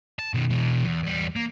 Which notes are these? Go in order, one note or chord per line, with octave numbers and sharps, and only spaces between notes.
A5
B2 D#3
B2 E3
E2
E2 G3
A#3